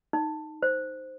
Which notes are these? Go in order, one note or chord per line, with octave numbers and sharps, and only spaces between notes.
D#4
C5